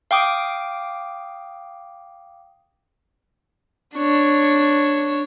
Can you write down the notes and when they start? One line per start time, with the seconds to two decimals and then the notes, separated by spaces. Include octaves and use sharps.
0.11 F5 G5 D6 D#6
3.96 D4 C#5